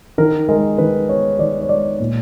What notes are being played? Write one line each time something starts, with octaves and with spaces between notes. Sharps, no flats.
D#3 A#4
G#3 A#4
D#3 B4
B3 C#5
D#3 D5
C#5
G#3 D5
A#2